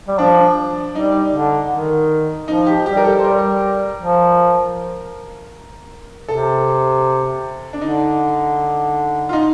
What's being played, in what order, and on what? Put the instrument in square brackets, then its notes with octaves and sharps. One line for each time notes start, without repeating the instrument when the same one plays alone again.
[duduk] G3
[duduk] F3 [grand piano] D4
[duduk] G3 [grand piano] D#4
[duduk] D3
D#3
[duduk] F3 [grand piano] D#4
[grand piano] G4
[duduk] G3 [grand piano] G4
[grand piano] A#4
A4
C5
[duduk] G3 [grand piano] A#4
[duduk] F3
[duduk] C3 [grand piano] A4
[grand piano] D4
[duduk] D3 [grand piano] D#4
[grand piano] F4
D#4